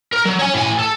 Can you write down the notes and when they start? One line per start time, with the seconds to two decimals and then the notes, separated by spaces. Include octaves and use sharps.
0.13 A#4
0.25 F#3
0.39 C#5 G#5
0.54 A2 G#5
0.79 A4